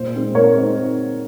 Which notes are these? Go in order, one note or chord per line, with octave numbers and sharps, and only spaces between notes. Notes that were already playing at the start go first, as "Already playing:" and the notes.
Already playing: A#2 C5
G#3 C4 D#4
A#2 A#4 C#5
G#3 C4 D#4